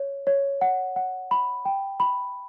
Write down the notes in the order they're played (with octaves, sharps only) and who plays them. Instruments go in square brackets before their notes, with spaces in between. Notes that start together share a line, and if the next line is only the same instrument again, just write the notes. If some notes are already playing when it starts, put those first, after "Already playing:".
Already playing: [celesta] C#5
C#5
F#5
F#5
B5
G5
B5